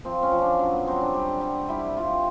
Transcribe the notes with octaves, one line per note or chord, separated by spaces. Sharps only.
F3 C4
C#4
F3
D4
F#3 C#4
B3
F#3 C4
D4
G3
G3
G3 E4
G3 F4